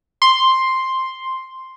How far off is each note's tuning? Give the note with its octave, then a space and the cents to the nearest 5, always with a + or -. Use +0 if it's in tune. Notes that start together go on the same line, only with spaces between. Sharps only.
C6 +5